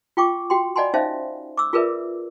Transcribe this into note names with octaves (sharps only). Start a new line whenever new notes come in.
F4 G5 C#6 D6
F#4 G5 C6
D5 D#5 F#5 G#5 B5 C6
C#4 D#4 C5 E5 F5
D6 E6
F4 G#4 A#4 B4 D5 E5